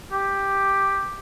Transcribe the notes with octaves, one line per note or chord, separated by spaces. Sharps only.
G4